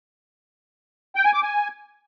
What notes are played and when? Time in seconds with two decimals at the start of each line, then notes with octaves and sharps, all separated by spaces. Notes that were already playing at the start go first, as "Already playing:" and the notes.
1.16 G5
1.25 G#5
1.34 D6
1.43 G#5